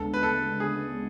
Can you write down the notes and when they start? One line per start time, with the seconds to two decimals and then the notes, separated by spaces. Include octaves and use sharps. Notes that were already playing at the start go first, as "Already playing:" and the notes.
Already playing: D2 C#3 G#3 B3 D4 A4
0.14 B4
0.23 A4
0.60 G#4